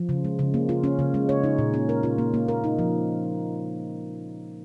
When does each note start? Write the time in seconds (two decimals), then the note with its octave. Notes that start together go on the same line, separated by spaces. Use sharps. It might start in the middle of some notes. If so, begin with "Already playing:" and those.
Already playing: F3
0.09 C#3
0.24 G#3
0.39 C#3
0.54 A#3
0.69 F4
0.84 C#4
0.99 C#3
1.14 G#3
1.29 C#5
1.44 D#4
1.59 A#2
1.74 C#4
1.89 A#4
2.03 F4
2.18 A#3
2.34 A#3
2.48 A#4
2.64 D#4
2.79 F3